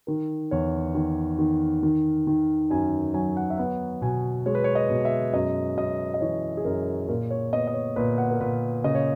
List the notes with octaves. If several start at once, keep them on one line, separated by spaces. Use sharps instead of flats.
D#3 A#4
E2 C#5
D#3
D#3
D#3
D#3
F#2 G#5
F#3 G#5
F#5
E5
B3 F#5
B2 G#5
G#3 C#5
B4
C#5
D#5
B2
E5
F#2 D#5
F#2 D#5
D#5
E3 C#5
G#4
F#2 A#4
A#2 A#4
C#5
B3 D#5
D#5
C#5
A#2 B4
F#5
A#4
A#2 B4
C#3 D#5
C#5